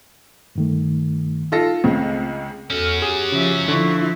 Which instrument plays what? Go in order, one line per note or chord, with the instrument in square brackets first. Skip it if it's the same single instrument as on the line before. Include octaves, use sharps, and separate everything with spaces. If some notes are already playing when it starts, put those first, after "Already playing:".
[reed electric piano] G2 D#3 A3
[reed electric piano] D#4 [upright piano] F4 A4 A#6
[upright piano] C#2 C#3 [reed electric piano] A3 C4
[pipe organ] E2 A4 F6 [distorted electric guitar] C#4 F#4
[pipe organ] G4 [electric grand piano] G#4
[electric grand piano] C#3 [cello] F3 E5
[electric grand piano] D3 [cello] F3 E4 [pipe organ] C#6